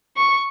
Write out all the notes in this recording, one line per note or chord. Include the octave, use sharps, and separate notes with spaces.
C#6